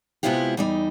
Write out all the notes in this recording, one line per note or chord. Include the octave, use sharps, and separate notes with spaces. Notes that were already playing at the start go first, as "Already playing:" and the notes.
C3 G#3 B3 E4 F4 G4
E2 G3 D#4